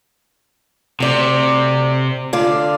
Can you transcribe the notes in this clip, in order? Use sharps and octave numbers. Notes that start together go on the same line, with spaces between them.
D2 C3 D5
D3 F4 D5